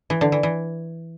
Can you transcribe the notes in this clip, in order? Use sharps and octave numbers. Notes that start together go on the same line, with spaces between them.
E3
D3
E3
E3